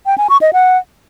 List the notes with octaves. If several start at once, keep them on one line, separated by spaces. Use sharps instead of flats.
G5
G#5
C#6
D#5
F#5